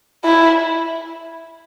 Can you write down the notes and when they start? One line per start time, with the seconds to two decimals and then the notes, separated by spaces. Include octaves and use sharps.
0.25 E4